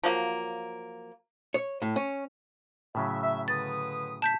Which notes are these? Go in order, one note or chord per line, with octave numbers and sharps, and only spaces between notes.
F3 F#3 A#3
C#5
A2
C#4
A2 C#3 F#3 E5
E5
D3 B4 D#6 A6
A5 G6 B6